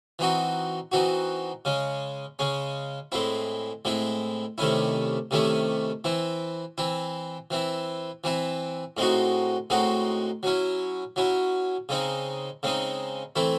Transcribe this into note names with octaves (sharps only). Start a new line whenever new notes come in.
E3 C4 D#4 F#4
E3 C4 D#4 F#4
C#3 G#3 C#4
C#3 G#3 C#4
A2 G#3 C4 E4
A2 G#3 C4 E4
C3 D#3 A3 C#4 E4
C3 D#3 A3 C#4 E4
E3 C4 E4
E3 C4 E4
E3 C4 E4
E3 C4 E4
A2 G#3 C4 D#4 F#4
A2 G#3 C4 D#4 F#4
F#3 C#4 E4
F#3 C#4 E4
C#3 G#3 C4 D#4
C#3 G#3 C4 D#4
E3 A3 C4 E4